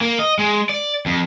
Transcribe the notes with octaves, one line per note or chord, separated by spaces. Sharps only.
A#3
D#5
G#3
D5
F2